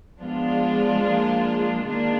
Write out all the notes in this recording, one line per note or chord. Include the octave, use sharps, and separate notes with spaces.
F3 G#3 B3 D4 F4
A#3
D#3 G#3 A#3 D4 F4